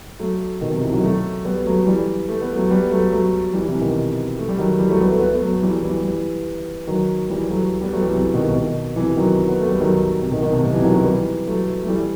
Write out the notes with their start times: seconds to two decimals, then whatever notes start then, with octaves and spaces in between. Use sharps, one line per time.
0.19 F#3 A3
0.61 B2 D#3
0.72 C3
0.83 C3 E3
0.93 D#3 F#3
1.03 F#3 A3
1.45 G3 B3
1.66 F#3 A3
1.87 E3 G3
2.28 A3
2.41 B3
2.55 F#3 A3
2.70 G3 B3
2.91 F#3 A3
3.12 F#3 A3
3.53 E3 G3
3.68 C3 E3
3.81 B2 D#3
4.39 A3
4.48 G3
4.58 D#3 F#3
4.79 E3 G3
4.89 F#3 A3
4.99 G3 B3
5.10 A3
5.19 B3
5.27 A3
5.35 B3
5.42 F#3 A3
5.62 E3 G3
5.83 E3 G3
6.04 E3 G3
6.87 D#3 F#3
7.30 E3 G3
7.50 F#3 A3
7.81 G3 B3
7.93 F#3 A3
8.02 E3 G3
8.13 C3 E3
8.34 B2 D#3
8.55 B2 D#3
8.96 C3 E3
9.17 D#3 F#3
9.48 B3
9.59 A3
9.69 G3
9.80 D#3 F#3
10.22 C3
10.31 B2 D#3
10.42 B2 D#3
10.53 C3
10.63 B2 D#3
10.73 C3 E3
10.84 D#3 F#3
10.95 D#3 F#3
11.05 E3 G3
11.46 F#3 A3
11.83 A3
11.88 E3 G3